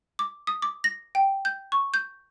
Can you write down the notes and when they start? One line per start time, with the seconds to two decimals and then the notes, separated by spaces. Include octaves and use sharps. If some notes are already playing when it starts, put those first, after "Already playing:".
0.19 D6
0.47 D#6
0.62 D6
0.84 A#6
1.15 G5
1.45 G6
1.72 C#6
1.94 G6